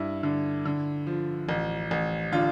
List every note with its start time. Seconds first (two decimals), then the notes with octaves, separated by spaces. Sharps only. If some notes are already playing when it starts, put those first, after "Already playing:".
Already playing: G2 E4
0.23 D3
0.65 D3
1.07 F3
1.49 A1
1.91 A1
2.32 D3 F4